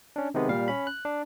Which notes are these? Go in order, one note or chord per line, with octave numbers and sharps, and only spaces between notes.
C#4 D4
C3 D#3 G#3 B3
A#2 G3 F5
C#4 B5
F#6
D4